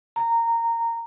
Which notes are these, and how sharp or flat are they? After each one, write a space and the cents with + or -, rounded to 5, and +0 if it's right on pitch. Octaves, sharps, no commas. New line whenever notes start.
A#5 -15